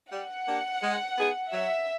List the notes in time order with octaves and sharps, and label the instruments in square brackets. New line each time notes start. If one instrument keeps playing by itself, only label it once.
[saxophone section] G3 [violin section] F#5
[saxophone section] A#3 D4 G4
G#3
B3 D#4 G#4
[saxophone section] F#3 [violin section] E5